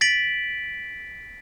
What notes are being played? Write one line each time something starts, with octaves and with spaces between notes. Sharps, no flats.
A6 B6 D7 F#7